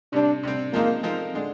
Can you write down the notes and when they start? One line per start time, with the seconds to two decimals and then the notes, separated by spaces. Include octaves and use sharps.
0.13 C3 G3 C4 D4
0.43 C3 G3 C4
0.73 F3 G#3 A#3 C4 D#4 A#4
1.03 F3 G#3 C4 D#4 A#4
1.34 D3 G#3 D4